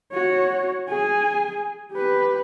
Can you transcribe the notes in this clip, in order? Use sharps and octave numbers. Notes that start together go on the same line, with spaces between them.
F#4 C#5
G#4 G#5
G4 B4